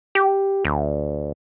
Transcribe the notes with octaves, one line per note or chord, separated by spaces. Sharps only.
G4
D2